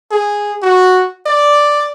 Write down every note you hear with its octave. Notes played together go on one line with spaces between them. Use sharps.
G#4
F#4
D5